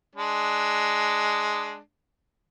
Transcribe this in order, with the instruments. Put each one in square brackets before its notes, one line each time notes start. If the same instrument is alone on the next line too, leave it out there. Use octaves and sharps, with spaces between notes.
[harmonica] G#3 D4